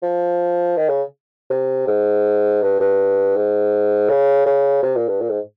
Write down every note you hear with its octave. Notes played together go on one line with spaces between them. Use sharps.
F3
D#3
C#3
C3
G#2
G2
G2
G#2
C#3
C#3
C3
A#2
G2
A#2
G#2